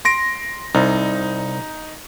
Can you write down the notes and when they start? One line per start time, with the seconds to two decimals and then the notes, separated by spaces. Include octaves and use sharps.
0.05 C6 A#6 D7
0.75 C2 D#4